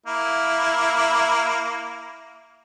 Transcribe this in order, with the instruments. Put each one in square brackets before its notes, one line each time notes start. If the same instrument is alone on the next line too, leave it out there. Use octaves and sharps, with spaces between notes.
[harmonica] A#3 E4